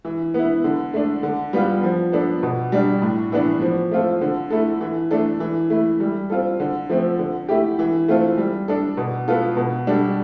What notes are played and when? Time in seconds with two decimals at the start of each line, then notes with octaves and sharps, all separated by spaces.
0.05 E3
0.34 B3 E4
0.64 D3
0.94 A3 D4
1.23 D3
1.53 G3 B3 F4
1.83 F3
2.12 B3 D4 A4
2.43 B2
2.72 G3 D4
3.02 A2
3.32 E3 B3 D4
3.62 F3
3.91 A3 C4 F4 A4
4.21 D3
4.50 A3 E4 A4
4.81 E3
5.11 A3 D4 A4
5.40 E3
5.70 A3 E4
6.00 G3
6.30 C4 F4 A4
6.60 D3
6.89 F3 A3 C4
7.19 D3
7.48 A3 E4 G4
7.79 E3
8.08 A3 C4 F4 A4
8.38 G3
8.68 D4 A4
8.97 B2
9.28 B3 F4 A4
9.57 B2
9.87 G3 D4 A4